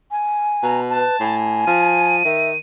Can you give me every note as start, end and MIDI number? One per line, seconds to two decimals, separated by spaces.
0.11 0.78 80
0.63 1.03 47
0.63 0.81 82
0.89 1.19 71
0.89 1.37 81
1.20 1.65 45
1.20 2.16 80
1.67 2.23 53
1.67 2.58 99
2.25 2.55 51
2.25 2.50 76